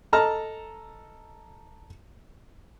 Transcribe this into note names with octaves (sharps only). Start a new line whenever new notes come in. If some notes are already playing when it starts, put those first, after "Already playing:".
A4 D#5 A5 A#5 F6